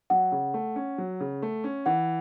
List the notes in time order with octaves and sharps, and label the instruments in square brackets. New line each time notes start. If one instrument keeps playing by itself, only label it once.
[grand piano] F#3 [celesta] F#5
[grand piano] C#3
A3
C#4
F#3
C#3
A3
C#4
[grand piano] E3 [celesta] F#5